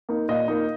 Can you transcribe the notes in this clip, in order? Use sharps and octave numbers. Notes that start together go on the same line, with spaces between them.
A#3 D#4
A#2 D#5
A#3 D#4